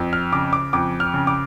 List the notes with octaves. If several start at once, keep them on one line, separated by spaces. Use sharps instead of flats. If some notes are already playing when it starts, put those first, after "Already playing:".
Already playing: F2
F6
C#3 D6
D6
F2 D6
F6
C#3
D6